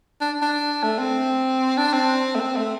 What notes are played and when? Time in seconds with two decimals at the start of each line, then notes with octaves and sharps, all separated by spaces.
0.21 D4
0.42 D4
0.83 A3
0.99 C4
1.78 D4
1.93 C4
2.36 A3
2.40 C4
2.57 A3